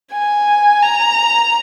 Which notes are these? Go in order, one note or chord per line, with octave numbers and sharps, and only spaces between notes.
G#5
A#5